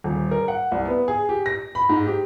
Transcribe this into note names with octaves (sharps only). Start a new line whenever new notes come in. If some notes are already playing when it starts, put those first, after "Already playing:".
D#1
A#4
F#5
C2
B3
G#4
G4
A#6
B5
G#2
G4